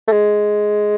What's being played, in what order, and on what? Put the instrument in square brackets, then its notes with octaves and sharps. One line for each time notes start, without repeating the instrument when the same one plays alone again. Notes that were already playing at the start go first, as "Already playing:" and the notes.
[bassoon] A3
G#3